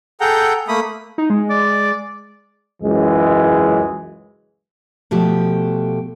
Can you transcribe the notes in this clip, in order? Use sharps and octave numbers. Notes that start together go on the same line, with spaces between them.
G#4 A4 F#5 G5 A#5 G6
A3 A#3 B5 D#6
D#4
G#3
D5
C#2 F#2 E3 G#3
B2 F3 A3 G4